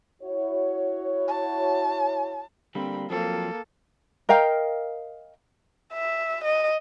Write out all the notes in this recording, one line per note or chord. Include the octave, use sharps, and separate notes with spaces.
E4 F#4 C#5
A5
D3 G3 A#3 C4 B5
F3 F#3 A#3 C4 A4
A#4 D#5 F5 G5
E5
D#5